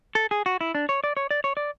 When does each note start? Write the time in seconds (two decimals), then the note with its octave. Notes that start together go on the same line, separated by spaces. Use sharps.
0.15 A4
0.31 G#4
0.46 F#4
0.61 E4
0.75 D4
0.89 C#5
1.04 D5
1.17 C#5
1.31 D5
1.44 C#5
1.57 D5